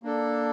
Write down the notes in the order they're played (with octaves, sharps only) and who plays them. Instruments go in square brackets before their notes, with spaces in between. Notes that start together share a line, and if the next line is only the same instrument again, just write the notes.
[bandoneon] A#3 D4 A4